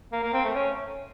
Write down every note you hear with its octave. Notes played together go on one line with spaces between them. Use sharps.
A#3
A#3
C4
A3
C#4